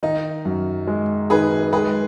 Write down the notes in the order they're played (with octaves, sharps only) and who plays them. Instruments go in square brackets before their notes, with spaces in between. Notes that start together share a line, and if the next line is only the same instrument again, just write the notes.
[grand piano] D#3 [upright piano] D#4
[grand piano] F#2
G#3
[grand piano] D#3 [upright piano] G#4 B4
[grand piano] G#3 [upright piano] G#4 B4